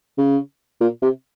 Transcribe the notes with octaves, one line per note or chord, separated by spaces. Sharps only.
C#3
A#2
C3